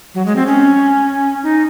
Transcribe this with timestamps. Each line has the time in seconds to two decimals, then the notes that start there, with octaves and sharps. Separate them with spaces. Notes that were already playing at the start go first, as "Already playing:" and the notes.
0.15 F#3
0.26 G#3
0.36 C4
0.47 C#4
1.43 D#4